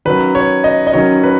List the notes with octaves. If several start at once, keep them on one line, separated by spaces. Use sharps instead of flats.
D#3 F#3 C#4 B4
C#5
D#5
D#5
D#3 F#3 C#4 C#5
B4